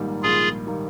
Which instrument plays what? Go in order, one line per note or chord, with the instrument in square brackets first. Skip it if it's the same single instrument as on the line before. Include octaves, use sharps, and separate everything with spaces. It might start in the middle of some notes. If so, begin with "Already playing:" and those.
Already playing: [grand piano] A#1 G#2 D#3 G3 A#3
[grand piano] A#1 [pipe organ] F4 G#4
[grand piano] D#3 G3 A#3